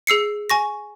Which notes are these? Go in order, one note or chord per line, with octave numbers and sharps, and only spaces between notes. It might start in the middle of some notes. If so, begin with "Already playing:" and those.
G#4 E6 C7 C#7
G#5 C#6 A#6